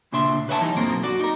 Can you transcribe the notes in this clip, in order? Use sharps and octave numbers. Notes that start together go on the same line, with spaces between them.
D2 A#2 C#3 D4 E5 C6
B4 C#5 E5 F#5 G5 A5
E3 G3 D#4
F#2 B2 D3 A#3 C4 A#4
F#4 D5
D#4 A#4